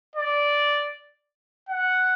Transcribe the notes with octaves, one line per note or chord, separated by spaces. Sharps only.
D5
F#5